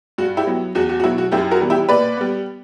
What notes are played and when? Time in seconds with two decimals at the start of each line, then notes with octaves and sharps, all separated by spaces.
0.18 G2 F#4
0.37 E4 G4
0.47 F#3 B3
0.75 E2 F#4
0.89 F#4
1.00 F#4
1.03 B2 F#3 E4
1.18 F#4
1.32 F#2 E4 G4
1.51 F#4 A#4
1.61 E3 G3 B3
1.70 E4 G4
1.89 A#2 B4 D5
2.17 G3 B3